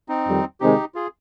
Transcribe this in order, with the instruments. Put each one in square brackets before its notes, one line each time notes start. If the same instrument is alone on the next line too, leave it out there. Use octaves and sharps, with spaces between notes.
[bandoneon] C4 D#4
[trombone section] F2 D#3 G3
[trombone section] C3 D#3 G#3 C4 [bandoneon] D#4 G4
[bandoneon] F4 G#4